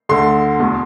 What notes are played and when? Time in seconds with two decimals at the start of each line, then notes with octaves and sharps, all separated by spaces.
0.09 D2 D3 C6
0.59 E2 B2